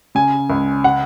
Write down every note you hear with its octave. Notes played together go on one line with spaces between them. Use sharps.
C#3 G#5
C#2
F#5